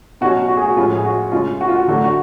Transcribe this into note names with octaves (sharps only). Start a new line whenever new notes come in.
B2 F#3 C#4 F#4
F#4
G#4
F#4
A2 F3 G#3 C#4 F4
G#4
F#4
C#3 G#3 C#4 F4
F#4
F4
F#4
D3 F#3 A3 D4 F#4
F#4